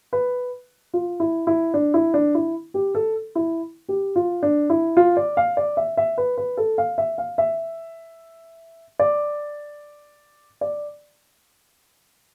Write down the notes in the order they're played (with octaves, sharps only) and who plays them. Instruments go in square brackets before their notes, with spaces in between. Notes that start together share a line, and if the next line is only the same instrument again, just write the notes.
[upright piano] B4
F4
E4
E4
D4
E4
D4
E4
G4
A4
E4
G4
F4
D4
E4
F4
D5
F5
D5
E5
E5
B4
B4
A4
F5
E5
F5
E5
D5
D5